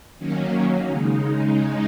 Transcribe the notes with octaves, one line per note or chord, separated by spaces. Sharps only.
D#3 F#3 A#3 C#4
C#3 G#3 D#4